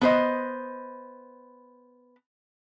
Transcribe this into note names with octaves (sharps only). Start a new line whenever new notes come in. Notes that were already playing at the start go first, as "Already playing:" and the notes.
B3 C5 D#5